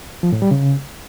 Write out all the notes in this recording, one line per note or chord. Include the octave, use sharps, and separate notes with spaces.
F3
A2
G3
C#3